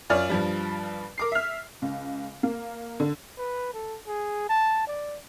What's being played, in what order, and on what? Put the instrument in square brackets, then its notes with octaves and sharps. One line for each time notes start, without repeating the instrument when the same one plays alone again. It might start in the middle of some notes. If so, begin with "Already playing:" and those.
[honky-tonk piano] F#2 F4 C#5 D5 F6
G2 F3 G3
A#4 D6 C7
E5 F6
C#2
A#3
D3
[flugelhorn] B4
A4
G#4
A5
D5